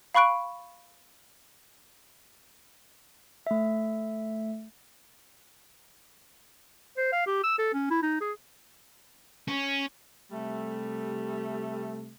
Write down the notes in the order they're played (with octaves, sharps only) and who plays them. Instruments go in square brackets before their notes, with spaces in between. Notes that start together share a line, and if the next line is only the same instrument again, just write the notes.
[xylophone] F5 B5 C#6 F#6 D7
[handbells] A3 E5
[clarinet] C5
F5
G4
E6
A4
C#4
E4
D#4
G#4
[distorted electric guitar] C#4
[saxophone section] C3 G3 A3